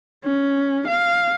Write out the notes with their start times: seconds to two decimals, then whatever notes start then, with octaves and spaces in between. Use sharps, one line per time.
0.24 C#4
0.87 F5